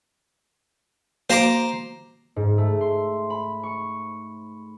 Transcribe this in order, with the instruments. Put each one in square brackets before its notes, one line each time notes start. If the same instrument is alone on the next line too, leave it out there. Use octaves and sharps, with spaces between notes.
[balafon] A#3 F#4 F5 [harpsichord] C5 A#5 D6
[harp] G#2
A3
C6
B5
C#6